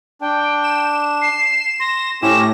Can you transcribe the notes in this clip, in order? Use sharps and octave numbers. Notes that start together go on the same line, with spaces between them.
D4 G5
E7
C7
C6 A#6
A2 C4 C#4 G4 A#6 E7